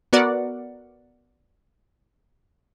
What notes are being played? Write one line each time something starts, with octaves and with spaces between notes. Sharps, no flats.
B3 F#4 A#4 D5 F#5